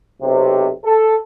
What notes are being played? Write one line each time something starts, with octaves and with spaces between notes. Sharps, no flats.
B1 C3
A4